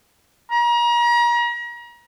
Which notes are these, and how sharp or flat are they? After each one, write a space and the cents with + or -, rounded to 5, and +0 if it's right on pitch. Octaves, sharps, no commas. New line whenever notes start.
A#5 +35